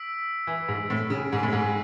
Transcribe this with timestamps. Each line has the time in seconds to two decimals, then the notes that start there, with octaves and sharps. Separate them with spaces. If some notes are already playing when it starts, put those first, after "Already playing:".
Already playing: E6 B6 D7 F#7
0.47 E3
0.68 G#2
0.90 A2
1.10 C#3
1.33 G#2
1.43 A2
1.53 G#2